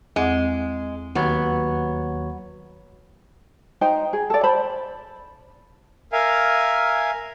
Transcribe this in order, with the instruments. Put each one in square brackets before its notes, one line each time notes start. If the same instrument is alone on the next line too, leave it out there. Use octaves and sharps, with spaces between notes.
[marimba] E2 C4 F#5 [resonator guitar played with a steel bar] G#3
[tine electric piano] D#2 F#3 C#5 [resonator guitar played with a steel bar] B3
[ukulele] D#4 C5 G5
G#4
A4 D5
C5 A5 B5
[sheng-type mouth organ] A#4 E5 F5 G#5